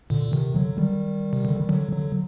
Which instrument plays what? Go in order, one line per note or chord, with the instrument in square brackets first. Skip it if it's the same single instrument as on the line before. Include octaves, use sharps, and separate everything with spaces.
[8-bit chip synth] A#2 D3
C3 D#3
D3 F#3
D#3 G3
C3
D3
D#3
D3 F#3
D3 F#3